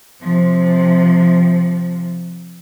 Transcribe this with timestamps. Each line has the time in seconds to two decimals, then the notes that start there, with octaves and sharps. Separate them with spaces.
0.22 C3 F3